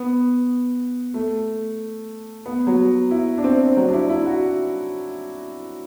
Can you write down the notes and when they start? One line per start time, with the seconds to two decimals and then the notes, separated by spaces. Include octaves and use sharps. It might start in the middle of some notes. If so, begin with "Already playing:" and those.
Already playing: B3
1.14 A3
2.46 B3
2.67 F#3
3.11 E4
3.38 D4
3.44 C4
3.77 F#3
3.88 D4
3.93 E4
4.09 E4
4.26 F#4